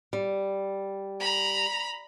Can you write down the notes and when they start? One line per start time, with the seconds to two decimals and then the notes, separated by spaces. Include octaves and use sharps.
0.13 G3
1.20 A#5 B5